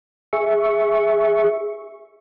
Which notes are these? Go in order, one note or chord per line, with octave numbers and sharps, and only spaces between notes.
G#4 E5 C#6